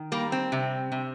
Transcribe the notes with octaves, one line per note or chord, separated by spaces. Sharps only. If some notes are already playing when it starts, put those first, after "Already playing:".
Already playing: D#3
G3 A#3
C4
C3
C3